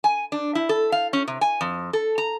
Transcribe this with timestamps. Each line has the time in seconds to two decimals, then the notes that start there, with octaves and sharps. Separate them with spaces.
0.04 G#5
0.32 D4
0.55 E4
0.69 A4
0.92 F5
1.13 C#4
1.28 C3
1.41 G#5
1.61 F2
1.93 A4
2.18 A#5